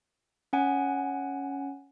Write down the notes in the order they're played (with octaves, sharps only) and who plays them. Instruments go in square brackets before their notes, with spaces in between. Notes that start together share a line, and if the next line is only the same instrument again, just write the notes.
[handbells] C#4 F#5 G#5